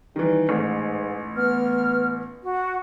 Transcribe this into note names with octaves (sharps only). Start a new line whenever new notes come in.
D#3 E3 G3
A1 G#2
B3 F6
F#4